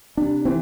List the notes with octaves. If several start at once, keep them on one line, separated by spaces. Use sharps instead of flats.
C3 D4
E3 C4